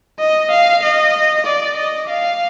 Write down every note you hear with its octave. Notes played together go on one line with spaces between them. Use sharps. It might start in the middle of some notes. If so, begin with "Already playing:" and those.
D#5
F5
D#5
D5
D#5
F5